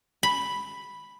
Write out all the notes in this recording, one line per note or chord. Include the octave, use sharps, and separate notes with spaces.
B5